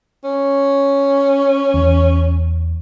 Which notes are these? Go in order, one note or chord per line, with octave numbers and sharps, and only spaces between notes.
C#4
E2